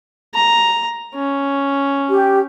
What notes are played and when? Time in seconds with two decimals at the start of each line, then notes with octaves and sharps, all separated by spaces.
0.34 A#5
1.15 C#4
2.10 G4